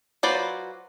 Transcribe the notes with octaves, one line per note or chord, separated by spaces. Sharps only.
F#3 F4 B4 C5 D5